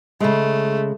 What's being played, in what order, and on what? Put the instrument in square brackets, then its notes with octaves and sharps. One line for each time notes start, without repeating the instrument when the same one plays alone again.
[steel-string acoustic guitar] C#3 G#3 [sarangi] A3